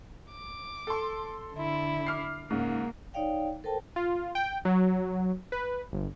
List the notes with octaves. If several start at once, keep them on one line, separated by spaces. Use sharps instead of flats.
D6
A4 C6
D3 E4
D6 F6 C7
G#2 C#3 A#3
D#4 C#5 D5 F5 G5
A4 A#4 C5 G5 A5
F4
G5
F#3
B4
G1